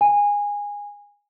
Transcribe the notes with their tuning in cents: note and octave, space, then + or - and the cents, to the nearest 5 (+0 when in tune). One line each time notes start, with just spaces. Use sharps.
G#5 -20